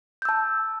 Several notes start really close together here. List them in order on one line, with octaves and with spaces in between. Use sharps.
G6 E6 A5